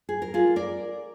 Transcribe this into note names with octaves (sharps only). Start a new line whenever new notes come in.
G#4
A#4
F4 G#4
A#4 D5